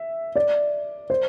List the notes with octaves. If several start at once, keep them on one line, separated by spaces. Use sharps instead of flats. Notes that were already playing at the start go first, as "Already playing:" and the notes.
Already playing: E5
D5
C5